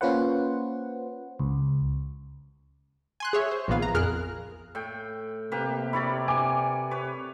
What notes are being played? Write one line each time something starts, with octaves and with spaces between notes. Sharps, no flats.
A#3 C#4 F4 B4 C5 F#5
C#2
G#5 C6 F#6
G#4 C#5 E5
C5
A#1 A#2 D#3 B3 F5
A#5
F2 G#4 A#4 F6 F#6
A2 G5
C3 A#3 G4 B4
E4 C#5 D5 B5
G#5 D6
B4 C#5